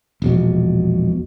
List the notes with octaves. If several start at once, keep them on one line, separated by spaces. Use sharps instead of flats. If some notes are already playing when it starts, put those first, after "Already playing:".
E1 A#1 B2